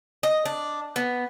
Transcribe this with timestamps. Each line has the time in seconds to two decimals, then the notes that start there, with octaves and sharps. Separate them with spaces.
0.23 D#5
0.45 D4
0.96 B3